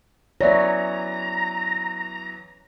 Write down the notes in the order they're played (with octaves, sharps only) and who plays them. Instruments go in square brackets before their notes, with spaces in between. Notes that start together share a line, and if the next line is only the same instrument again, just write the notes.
[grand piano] E3 F#3 B3 [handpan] C#5 [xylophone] D5 E5 [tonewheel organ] A#5